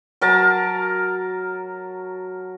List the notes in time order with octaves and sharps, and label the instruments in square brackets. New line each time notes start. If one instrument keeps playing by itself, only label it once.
[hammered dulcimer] F#3 A#4 A5